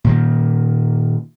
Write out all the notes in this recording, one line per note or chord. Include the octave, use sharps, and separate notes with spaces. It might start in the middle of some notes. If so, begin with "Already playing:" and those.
A#2 D#3 A#3